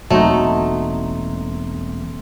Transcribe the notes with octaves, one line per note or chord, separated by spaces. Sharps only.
E1 F#3 A3 A#3 C4 D#4 C6